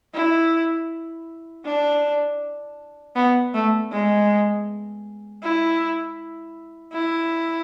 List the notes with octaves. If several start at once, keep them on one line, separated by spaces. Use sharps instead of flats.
E4
D4
B3
A3
G#3
E4
E4